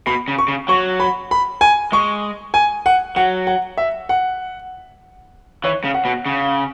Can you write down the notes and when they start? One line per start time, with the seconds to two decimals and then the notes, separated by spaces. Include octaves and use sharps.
0.07 B2 B5
0.28 C#3
0.38 C#6
0.48 C#3
0.68 F#3 C#6
1.00 B5
1.31 B5
1.61 G#5
1.92 G#3 C#6
2.54 G#5
2.86 F#5
3.16 F#3 F#5
3.47 F#5
3.78 E5
4.09 F#5
5.64 E3 C#5
5.84 C#3
5.94 F#5
6.05 B2
6.26 C#3